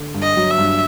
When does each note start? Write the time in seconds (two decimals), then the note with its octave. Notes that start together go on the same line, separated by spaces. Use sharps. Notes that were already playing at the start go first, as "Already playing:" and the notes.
Already playing: D3
0.14 G2
0.22 D#5
0.36 F#3
0.51 E5
0.58 G2